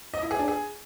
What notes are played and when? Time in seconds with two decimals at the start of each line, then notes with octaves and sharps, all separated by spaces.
0.14 D#5
0.22 E4
0.31 G#4
0.39 D4
0.48 G#4